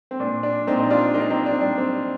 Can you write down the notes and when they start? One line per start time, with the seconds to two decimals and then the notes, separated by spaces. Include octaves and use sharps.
0.11 C4
0.20 A#2 D4
0.43 D4
0.67 A#2 C4 D#4
0.79 D#4
0.90 D4 F4
1.14 A#3 D#4
1.22 D4
1.30 C4 D#4
1.46 D4
1.52 C4
1.61 G3 D4
1.78 C4